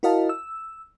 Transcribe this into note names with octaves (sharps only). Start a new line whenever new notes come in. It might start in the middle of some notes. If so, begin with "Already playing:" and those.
E4 F#4 A#4 D#5 F5 A5
E6